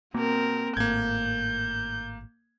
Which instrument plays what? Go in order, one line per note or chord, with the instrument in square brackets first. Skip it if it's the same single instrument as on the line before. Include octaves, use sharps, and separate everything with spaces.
[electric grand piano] B2 [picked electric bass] A#3 [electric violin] C4 A#4
[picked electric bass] G#1 A2 [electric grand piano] A#3 G#6 [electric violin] G6